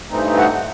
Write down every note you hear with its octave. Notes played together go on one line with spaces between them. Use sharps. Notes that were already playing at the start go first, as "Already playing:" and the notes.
G2 E3 A3 C4 D#4
F#5